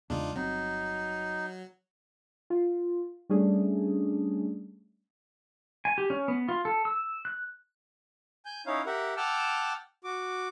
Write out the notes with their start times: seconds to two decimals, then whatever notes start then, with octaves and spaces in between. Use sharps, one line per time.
0.10 E2 C#3 G#3 D4 D#4 F4
0.36 G1 F#3 C4 D#4
2.50 F4
3.29 G3 A3 C#4 D4 G#4
5.85 G#5
5.98 G4
6.10 C#4
6.28 B3
6.48 F4
6.65 A4
6.85 E6
7.25 F#6
8.45 G#5 G6
8.66 C#4 D#4 E4 C#5 F5
8.86 G4 A#4 E5 F#5
9.17 F#5 G5 A5 D6 E6 F6
10.04 F#4 D6